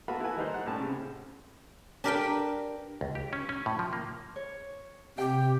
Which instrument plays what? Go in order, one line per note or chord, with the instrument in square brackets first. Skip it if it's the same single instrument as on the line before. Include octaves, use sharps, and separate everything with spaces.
[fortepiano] B3 F4 F#4 A4 B5
E4 F#4 A4 B4 G#5
D#3 G3 D#4 B4 C5
F#5
A2 G3 C#4 A5
C#3 C4
[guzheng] D4 G4 A#4 B4 F5 G5
[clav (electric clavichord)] C#2
G4
C#4
C#4
A2
F3
A#3
[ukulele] C#5
[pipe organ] C3 [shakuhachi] G4 [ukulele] G5